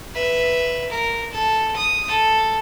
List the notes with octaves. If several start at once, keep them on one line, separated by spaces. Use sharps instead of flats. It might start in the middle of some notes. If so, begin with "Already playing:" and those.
B4 E5
A#4
A4
D#6
A4